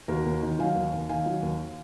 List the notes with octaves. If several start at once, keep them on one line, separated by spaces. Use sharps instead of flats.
D#2 F#4 A#4
D#2
D#3
F#3 F5 G#5
D#2
D#2
D#3 F5 G#5
F#3
D#2